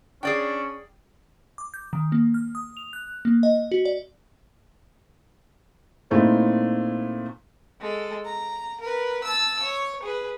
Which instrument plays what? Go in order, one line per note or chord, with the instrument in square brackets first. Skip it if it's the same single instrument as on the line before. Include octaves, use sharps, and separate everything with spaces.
[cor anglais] C#4 [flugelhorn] D4 [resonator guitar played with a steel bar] G#4 D5 G5
[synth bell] D6
G6
D#3
A#3
F6
D#6
F7
F#6
A#3
D#5
F#4
D5
[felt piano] A#2 A3 C4 D#4 E4
[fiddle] G#3 A4
A#5
A#4 B4
A5 E6
C#5
G#4 B4